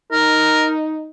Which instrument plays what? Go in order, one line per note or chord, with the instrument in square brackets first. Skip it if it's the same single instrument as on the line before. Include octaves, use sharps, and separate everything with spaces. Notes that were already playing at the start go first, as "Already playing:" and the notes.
[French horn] D#4 [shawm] A#4